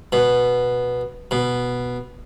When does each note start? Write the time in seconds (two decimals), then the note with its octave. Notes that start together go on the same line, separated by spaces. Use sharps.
0.12 B2
1.31 B2